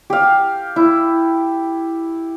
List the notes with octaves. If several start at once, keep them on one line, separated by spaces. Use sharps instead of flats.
G4 F5
E4